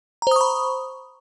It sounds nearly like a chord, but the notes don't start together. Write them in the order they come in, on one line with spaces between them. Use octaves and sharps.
A#5 C5 D#6 C#6 B5